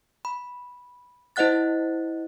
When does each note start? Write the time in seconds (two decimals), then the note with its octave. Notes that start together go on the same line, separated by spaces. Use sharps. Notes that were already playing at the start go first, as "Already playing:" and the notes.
0.25 B5
1.36 E4 C5 D#5 F#5 F#6 A6